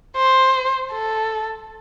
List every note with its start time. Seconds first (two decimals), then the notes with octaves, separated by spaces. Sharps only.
0.16 C5
0.92 A4